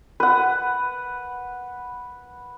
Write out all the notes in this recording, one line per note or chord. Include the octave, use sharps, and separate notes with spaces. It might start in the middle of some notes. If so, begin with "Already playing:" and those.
B4 F#5